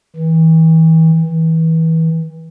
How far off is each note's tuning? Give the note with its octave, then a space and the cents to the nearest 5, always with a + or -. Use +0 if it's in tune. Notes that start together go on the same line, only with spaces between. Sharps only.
E3 -35
E3 -30